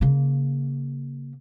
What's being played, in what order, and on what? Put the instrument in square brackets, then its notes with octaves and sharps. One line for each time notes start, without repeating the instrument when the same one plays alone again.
[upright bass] C#3 A#3